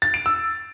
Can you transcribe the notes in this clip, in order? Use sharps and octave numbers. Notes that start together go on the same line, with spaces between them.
A6
D7
E6